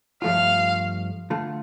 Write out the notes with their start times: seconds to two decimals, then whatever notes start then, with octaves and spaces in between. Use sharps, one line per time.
0.22 G2 F3 A3 F4 F5
1.30 D3 A3 F4